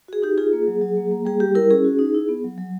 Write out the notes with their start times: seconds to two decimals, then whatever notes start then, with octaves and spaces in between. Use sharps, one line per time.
0.08 F#4 G#4
0.22 D#4 G4
0.38 F4 G#4
0.53 A#3
0.67 F#3
0.81 F#3
0.97 A#3
1.11 A#3
1.25 G3 G#4
1.40 G3 G4
1.55 E4 A#4
1.70 C#4 G#4
1.85 F#4
1.99 D#4
2.14 E4
2.29 B3
2.44 F#3
2.58 F#3